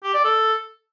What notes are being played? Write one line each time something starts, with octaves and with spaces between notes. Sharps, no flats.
G4
D5
A4